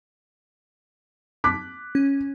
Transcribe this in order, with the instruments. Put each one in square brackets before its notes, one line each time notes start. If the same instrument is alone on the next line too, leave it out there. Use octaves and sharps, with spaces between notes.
[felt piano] D6 F#6 B6
[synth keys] C#4